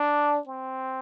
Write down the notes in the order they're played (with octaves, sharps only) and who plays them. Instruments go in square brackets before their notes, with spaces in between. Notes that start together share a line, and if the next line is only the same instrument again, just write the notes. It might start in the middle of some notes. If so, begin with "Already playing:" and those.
Already playing: [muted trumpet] D4
C4